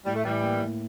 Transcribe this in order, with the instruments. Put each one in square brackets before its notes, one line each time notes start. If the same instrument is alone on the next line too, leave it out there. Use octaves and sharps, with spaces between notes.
[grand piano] A2 [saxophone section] G3
[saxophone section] A3
[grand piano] A2 [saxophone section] E3 G3
[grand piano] A#3
A2